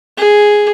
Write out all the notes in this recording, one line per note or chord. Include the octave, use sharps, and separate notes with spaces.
G#4